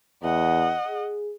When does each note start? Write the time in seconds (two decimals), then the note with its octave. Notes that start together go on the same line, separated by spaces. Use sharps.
0.23 E2 D#5 F#5
0.88 G#4